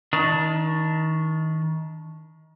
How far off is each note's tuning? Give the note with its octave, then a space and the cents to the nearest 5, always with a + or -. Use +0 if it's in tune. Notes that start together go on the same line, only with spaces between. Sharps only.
D#3 +30 D4 +0